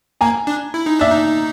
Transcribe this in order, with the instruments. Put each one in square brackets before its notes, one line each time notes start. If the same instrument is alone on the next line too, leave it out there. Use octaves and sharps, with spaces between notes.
[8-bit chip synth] A#3 [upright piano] G#5 A#5
[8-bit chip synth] D4
E4
D#4
[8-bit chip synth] D4 [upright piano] D5 E5
[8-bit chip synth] D#4